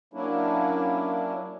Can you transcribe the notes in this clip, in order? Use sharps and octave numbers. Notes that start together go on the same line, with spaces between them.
F#3 A#3 C#4 D4 E4